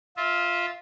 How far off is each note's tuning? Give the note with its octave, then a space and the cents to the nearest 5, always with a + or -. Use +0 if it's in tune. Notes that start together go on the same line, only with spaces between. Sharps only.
F4 +0 E5 -25